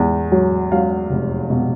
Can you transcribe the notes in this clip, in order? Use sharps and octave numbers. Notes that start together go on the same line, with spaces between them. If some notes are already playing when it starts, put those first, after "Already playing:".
Already playing: E2
F#3
F#3 F5
F1
B2